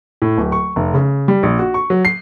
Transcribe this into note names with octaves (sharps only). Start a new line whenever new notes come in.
A2
D1
C#6
F1
C#3
G3
A#1
F#4
C#6
F#3
C7